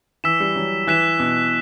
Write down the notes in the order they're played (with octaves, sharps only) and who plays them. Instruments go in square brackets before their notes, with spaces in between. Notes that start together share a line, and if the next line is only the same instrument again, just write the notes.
[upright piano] E3 [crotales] E6 B6 E7
[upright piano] G3
F#3
[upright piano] E3 [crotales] F#6 B6 E7
[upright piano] B2